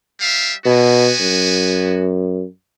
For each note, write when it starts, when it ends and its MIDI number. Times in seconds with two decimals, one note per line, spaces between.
0.20 0.53 55
0.20 0.53 76
0.20 0.53 77
0.66 1.11 47
0.66 2.08 59
0.66 2.08 66
0.66 2.08 80
1.20 2.45 42